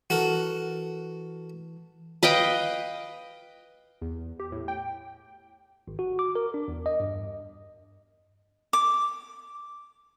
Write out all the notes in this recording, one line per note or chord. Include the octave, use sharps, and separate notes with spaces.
E3 F#4 A4 A#4
B4 D#5 F5 G5
E2
G4
A2
G5
G#1
F#4
D6
A#4
D4
E2
D#5
G2
D6